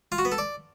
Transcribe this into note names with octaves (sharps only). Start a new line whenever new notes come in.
F4
F#4
B3
A4
D5